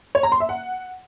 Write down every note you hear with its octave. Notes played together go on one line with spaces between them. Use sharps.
C#5
A#5
C6
E5
F#5